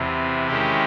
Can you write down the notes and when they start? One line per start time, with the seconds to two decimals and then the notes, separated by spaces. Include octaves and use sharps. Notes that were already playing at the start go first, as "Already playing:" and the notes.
Already playing: E2 C3 E3
0.47 D#3 G#3 C#4 E4 G4